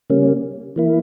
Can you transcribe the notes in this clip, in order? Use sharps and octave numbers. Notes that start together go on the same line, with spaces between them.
C#3 G3 A#3 C#4
E3 A#3 E4